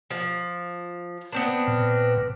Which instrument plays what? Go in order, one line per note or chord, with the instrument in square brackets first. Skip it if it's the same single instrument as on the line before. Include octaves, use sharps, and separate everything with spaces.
[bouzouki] F3
B3 C4 D4
[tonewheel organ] A#2